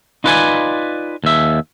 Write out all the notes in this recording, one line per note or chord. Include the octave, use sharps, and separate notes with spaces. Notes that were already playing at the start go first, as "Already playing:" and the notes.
D#4 F4 B4 D5 F#5 G#5
D#2 E5